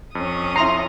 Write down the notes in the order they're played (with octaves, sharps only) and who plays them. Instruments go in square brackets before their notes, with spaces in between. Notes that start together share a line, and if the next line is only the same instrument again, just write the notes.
[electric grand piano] F2 [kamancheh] C#4 D#6
[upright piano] E4 C6 C7 [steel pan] A#5